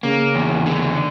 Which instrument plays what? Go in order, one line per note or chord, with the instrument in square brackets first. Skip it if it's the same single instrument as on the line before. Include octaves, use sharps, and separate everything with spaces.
[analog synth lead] C#3 [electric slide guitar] A#3
[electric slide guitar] E2
D3